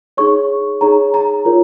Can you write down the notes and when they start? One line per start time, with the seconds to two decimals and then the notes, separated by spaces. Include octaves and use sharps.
0.17 D#4 G#4 C#5 C#6
0.81 D#4 G#4 C#5 A#5
1.14 A#5
1.45 F4 A#4 C#5